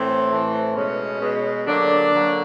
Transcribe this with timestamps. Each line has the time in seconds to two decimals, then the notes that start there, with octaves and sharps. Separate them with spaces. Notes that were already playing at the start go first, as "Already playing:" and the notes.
Already playing: A2 E3 C4
0.29 A2 E3 A3
0.74 B2 G#3 B3 C#4
1.20 B2 G#3 B3
1.67 D3 F#3 A#3 D4
2.12 D3 F#3 A#3